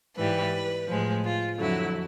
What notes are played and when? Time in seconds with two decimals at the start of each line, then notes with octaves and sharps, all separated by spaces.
0.16 G#2 E3 G3 B4
0.88 A2 F3 G#3
1.23 F4
1.58 F2 D3 F#3 E4